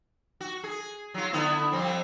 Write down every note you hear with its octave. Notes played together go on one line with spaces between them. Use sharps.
F#4
G#4
F#3 F4
D3 B3 E4
F2 G3 C4